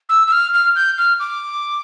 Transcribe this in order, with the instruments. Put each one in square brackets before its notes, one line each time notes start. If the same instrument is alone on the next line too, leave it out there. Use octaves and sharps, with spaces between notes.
[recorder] E6
E6
F6
F6
G6
F6
D6